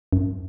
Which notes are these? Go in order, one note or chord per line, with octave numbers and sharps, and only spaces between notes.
F#2